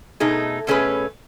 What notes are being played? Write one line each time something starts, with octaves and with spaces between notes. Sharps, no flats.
B2 A3 D#4 G#4
B2 A3 C#4 G#4 B4